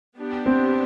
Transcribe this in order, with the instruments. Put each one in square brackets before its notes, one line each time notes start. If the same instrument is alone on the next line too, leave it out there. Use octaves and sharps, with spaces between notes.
[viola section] B3 D4 G4
[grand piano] C4